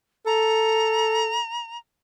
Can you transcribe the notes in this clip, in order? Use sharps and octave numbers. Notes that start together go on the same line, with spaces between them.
A4 A#5